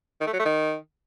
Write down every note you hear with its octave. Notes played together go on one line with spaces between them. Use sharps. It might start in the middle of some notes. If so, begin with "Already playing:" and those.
D#3
A3
F#3
A3
D#3